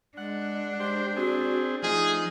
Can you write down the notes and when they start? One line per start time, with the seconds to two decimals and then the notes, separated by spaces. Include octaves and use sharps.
0.17 G#3 D4 F#5
0.80 G#3 G4 C5
1.17 C4 F#4 G#4
1.83 F3 A3 D#4 G#4